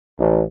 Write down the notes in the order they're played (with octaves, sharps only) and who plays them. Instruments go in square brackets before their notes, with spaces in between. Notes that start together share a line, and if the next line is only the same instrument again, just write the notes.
[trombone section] A1